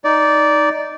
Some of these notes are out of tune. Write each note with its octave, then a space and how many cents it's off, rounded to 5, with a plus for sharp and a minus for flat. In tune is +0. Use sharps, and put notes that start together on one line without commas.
D#4 +0 D5 -10